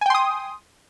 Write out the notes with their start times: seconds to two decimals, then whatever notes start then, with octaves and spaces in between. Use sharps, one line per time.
0.01 G#5
0.06 G5
0.10 C6
0.15 D#6